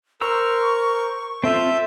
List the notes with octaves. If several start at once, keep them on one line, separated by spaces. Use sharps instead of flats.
A#4 C5 A#5 C#6 E6
C4 F4 A4 E5 G6